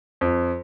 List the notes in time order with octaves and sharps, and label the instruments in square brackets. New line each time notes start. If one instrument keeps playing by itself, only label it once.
[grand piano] F2